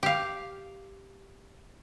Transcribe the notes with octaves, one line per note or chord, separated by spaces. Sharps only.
G4 F5